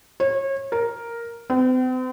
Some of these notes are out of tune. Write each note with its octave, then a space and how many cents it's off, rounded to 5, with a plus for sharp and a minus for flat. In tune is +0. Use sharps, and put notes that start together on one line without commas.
C#5 -30
A#4 +0
C4 -45